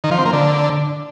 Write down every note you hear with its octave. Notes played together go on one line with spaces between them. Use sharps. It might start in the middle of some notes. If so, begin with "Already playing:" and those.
D#3
F3
C4
A#3
D3